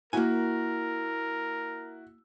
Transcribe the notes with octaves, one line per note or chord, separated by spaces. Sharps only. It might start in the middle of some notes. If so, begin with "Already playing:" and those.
A#3 E4 F#4 A#4 G#5